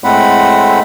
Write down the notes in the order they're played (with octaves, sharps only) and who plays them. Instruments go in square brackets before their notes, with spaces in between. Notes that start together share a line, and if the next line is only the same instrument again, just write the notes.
[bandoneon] A2 G#3 A3 C4 F#5 B5